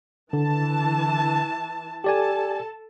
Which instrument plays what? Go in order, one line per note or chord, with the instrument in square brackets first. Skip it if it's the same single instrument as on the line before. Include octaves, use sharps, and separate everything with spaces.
[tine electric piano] D3 [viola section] E3 A5
[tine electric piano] G4 D5 G#5 [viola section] A4 A5